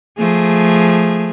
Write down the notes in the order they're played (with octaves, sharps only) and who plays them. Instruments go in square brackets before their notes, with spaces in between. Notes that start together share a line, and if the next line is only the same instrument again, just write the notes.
[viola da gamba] F3 A3 G#4